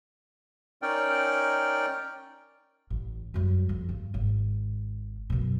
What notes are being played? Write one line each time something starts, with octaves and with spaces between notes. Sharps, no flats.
C#4 D#4 A#4 D5 G5
A1
F#2 G3
F2
G2
G#1
F#2 B2